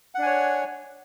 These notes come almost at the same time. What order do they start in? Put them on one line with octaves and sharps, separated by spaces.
F#5 D4 G#5 C#5